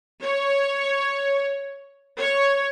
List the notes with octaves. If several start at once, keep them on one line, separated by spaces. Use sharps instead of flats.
C#5
C#5